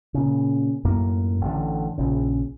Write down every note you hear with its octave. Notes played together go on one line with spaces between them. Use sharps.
A#2 C#3
F#2 A2 A#3
A1 D3
A#1 C#3